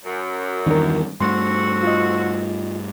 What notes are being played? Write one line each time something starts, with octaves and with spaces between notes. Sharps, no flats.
F#2
E2 G2 D#3 D4 A#4
G2 D3 A3 C4 F#4 C6
F4 D#5